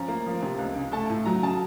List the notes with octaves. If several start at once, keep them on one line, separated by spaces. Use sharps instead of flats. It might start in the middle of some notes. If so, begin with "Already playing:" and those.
Already playing: F3 C#4 A#5
A#3
F3
C3
C#2
C#3
A3 A5
A2
F#3 A#5
C#3 A5